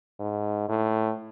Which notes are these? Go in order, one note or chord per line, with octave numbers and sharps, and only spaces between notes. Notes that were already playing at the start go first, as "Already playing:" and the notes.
G#2
A2